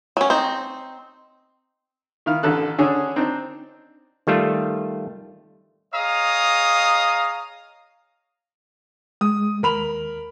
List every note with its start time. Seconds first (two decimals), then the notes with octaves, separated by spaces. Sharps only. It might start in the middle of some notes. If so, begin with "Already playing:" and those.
0.17 F#3 C#4
0.30 C4 D#4
2.26 D#3 E4 F5 F6
2.43 A1 D3 A4 F#6
2.78 D3 C#4 D4 G#4
3.16 C4 D4 D#4
4.27 D#3 G3 A3 F4
5.93 G#4 C#5 D#5 F5 A#5 D#6
9.21 G#3 D#6
9.63 D#2 A#4 B5 F7